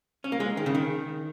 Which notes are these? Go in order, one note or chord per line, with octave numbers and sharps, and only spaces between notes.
C#4
A#3
G#3
D#3
C#3
D#3